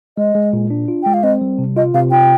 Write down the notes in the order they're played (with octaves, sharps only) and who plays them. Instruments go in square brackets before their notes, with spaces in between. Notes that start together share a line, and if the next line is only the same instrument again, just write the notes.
[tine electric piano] G#3 [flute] D#5
[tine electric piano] G#3
A#2
D4
F4
[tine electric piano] G#3 [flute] G5
[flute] F5
[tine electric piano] C4 [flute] D#5
[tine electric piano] G3
C3
[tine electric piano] F4 [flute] D#5
[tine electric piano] C3 [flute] F5
[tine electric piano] F4 [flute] G5